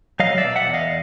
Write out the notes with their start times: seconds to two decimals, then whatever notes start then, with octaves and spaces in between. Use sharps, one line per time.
0.20 F#3 D#5 F5
0.38 D5 E5
0.44 B2
0.56 E5 F#5
0.67 E2
0.74 D#5 F5